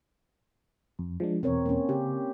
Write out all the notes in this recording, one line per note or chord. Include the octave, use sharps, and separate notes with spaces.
F2
F3 G#3 D4
E2 B2 C4 A#4 C#5
A#3 C#4
C#3 G4